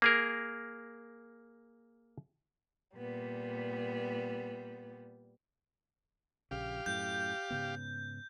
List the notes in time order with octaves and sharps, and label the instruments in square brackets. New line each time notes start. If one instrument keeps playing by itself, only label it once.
[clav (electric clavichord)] A#3 G#4 A#4
[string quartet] A#2 G3 B3
[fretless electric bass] A#1 C#3 [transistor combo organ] G4 F5
[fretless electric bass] F#2 A2 [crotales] G6
[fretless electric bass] G#2 C#3 B3